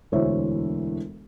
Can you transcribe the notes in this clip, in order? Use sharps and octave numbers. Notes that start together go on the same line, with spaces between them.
E1 D2 E3 C5 C#5 E5